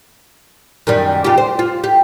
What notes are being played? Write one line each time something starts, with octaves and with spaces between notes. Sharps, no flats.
F#2 D#3 G3
C#3 F4 G4
C5
F4
G4